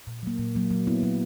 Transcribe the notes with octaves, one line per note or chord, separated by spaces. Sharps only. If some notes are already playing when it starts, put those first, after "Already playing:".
A#2
F#3 A#3
A#2
F#3 A#3
F#3
B3 E4
F#3